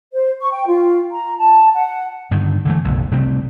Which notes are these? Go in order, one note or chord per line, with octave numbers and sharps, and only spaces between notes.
C5
C#6
G5
F4
A#5
A5
F#5
G2 D3 D#3
D3 E3 F3 A3
F#1 B1
C3 G3 A3 C4